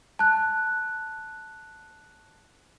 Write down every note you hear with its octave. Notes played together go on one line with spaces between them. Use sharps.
A5 F#6